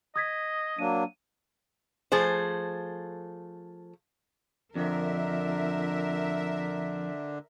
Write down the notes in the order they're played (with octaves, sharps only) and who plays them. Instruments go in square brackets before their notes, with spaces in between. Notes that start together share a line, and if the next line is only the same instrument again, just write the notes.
[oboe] D#5 [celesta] D#6 G#6 B6
[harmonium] F#3 A#3 D4 [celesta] D#7
[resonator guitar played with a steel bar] F3 A3 G#4 C5
[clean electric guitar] F2 [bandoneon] D3 D4 [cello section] A#4 E5